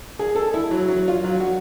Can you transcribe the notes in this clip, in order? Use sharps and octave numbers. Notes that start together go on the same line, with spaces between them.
G#4
A4
E4
F#3
F#3
F4
F#3
F#4